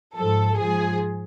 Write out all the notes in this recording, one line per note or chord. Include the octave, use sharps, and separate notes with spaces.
G#2 F3 A4
G#2 F3 G#4